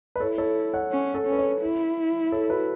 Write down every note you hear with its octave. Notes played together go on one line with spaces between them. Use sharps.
B4
E4 A4 C#5
A4 C#5
C#5 F#5
C#4
A4 C#5
C#4
B4
A4 C#5
E4
A4 C#5
F#4 B4